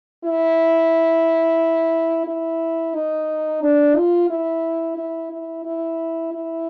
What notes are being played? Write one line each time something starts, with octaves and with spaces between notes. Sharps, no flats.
E4
E4
D#4
D4
F4
E4
E4
E4
E4
E4